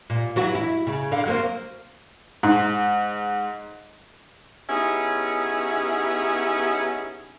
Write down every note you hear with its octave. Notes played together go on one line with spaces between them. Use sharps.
A#2
E3 F#3 F#4
E4
C#3
D3 F5
F#3 A#3 C4
G#2
B3 C#4 D#4 E4 G4 G#4